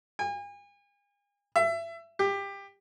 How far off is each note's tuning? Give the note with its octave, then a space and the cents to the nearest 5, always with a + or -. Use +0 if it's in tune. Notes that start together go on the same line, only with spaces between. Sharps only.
G#5 -40
E5 +25
G4 +20